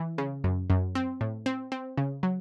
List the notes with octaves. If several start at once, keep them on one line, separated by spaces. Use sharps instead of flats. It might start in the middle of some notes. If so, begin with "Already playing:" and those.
Already playing: E3
C#3
F#2
F#2
C4
A2
C4
C4
C#3
F#3